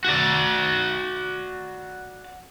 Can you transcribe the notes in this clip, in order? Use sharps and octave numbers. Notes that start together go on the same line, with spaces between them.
F#4 D5